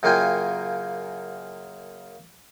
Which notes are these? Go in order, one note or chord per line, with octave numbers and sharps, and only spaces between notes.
F#2 C#3 A#3 F4 G5 G#5